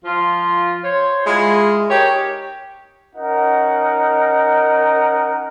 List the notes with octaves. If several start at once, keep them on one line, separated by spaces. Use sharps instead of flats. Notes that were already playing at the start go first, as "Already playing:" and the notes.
F3 F4
C5 C#5
G#3 E4 F4
D#4 G4 A#4 C#5
C#4 D#4 A#4 F#5